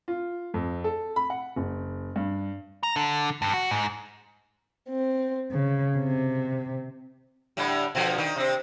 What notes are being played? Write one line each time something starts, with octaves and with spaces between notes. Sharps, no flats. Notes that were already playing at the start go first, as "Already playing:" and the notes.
F4
F2
A4
B5
F#5
F#1
G2
A#5
D3
G2
F#4
G#2
C4
C#3
C3
A2 D3 G3
B2 D3 F3
D#3 D#4
C3 C4